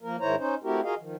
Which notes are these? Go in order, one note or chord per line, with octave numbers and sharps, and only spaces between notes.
F3 A#3 A#4
G#2 D#3 E4 C5 C#5 A#5
C#4 D#4 C5
A3 C4 E4 F#4 G4 A#4
F4 F#4 G#4 A#4 D#5 F5
D#3 F3